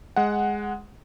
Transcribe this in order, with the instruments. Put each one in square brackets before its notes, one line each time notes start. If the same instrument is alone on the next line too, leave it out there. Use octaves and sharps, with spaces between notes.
[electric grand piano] G#3 F#5